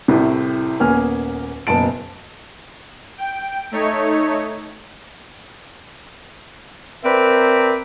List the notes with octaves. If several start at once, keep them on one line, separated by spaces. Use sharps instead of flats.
C2 A2 C3
D#1 A#3 B3 C#4 G#5 F6
F#1 B2 A5 D7
G5
A3 D#4 C#5
C4 A#4 B4 D5 E5